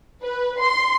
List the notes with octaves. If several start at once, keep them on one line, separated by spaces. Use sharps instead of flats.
B4
C6